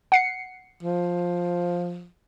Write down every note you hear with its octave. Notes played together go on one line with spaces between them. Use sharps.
F#5 C7 C#7
F3